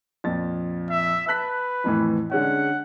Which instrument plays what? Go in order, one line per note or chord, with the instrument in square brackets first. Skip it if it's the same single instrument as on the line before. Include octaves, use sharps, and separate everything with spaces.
[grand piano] F2 A#2 A6
[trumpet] E5
[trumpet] B4 [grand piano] A5 F#6 B6
[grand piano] F2 A2 E3
[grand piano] D3 G#3 C#4 [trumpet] F#5